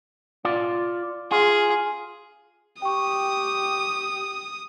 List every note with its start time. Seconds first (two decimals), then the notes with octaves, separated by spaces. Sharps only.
0.45 F4 D5
1.31 F4 G#4
2.82 G4 G5 C#6 D#6